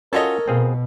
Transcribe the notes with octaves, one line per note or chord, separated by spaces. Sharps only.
C#4 F4 F#4 A4 A#4 C#5 D#5
B2 C4 G#4 F5